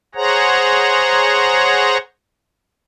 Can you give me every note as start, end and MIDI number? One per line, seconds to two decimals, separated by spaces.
0.15 1.97 68
0.15 1.97 72
0.15 1.97 73
0.15 1.97 78
0.15 1.97 82